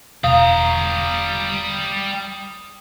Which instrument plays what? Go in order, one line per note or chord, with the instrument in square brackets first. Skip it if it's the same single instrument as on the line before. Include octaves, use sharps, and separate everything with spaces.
[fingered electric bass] E1 [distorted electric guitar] G3 A#5 [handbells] F5 [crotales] D#6